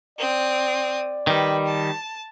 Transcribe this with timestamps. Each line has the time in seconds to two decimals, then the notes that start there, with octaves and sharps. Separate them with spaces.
0.19 C4 D5 D#6
1.27 D#3 G3 B4
1.66 A5